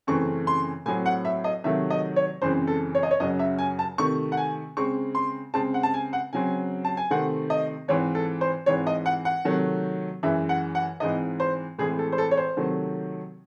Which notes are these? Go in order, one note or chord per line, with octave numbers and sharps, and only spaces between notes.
F#2 C#3 E3 A3 C4 C#6
C6
A2 F#3 C4 G#5
F#5
E5
D#5
C3 D#3 F#3 A3 E5
D#5
C#5
F#2 C#3 E3 G#3 C4 C5
A4
C#5
D#5
C#5
F#2 C#3 F#3 D#5
E5
G#5
A5
C3 D#3 A3 C#6
F#5
G#5
C#3 G#3 C4 C#6
C6
C#3 G#3 C4 A5
F#5
A5
G#5
F#5
C#3 F#3 C4 G#5
A5
G#5
C3 D#3 A3 C4 F#5
D#5
G#2 E3 C4 C#5
A4
C5
G#2 E3 C4 C#5
D#5
F#5
F#5
C3 D#3 F#3 A3
F#2 E3 G#3 E5
F#5
F#5
G#2 E3 C4 D#5
C5
A2 E3 G#3 C4 G#4
A4
C5
A4
C#5
C5
C3 D#3 F#3 A3